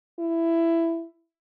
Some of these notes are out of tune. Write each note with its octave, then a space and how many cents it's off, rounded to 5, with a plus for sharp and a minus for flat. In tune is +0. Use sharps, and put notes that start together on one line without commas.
E4 +10